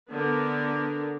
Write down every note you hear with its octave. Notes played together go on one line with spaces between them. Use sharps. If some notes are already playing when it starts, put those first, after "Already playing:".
D3 B3 A#4